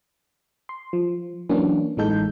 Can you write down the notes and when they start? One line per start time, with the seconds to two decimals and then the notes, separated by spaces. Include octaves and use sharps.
0.69 C6
0.93 F3
1.49 E3 F#3 A#3 C#4 D4
1.97 A1 E3 G#3 D#4 A4 G6